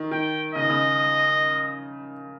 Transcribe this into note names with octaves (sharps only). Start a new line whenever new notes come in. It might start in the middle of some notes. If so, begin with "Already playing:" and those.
Already playing: D#3
D#3 G5
C#3 D#5
D#3
C#3